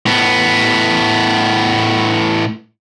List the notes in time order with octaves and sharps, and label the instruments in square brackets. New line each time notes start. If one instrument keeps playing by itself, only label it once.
[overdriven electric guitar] A2 B3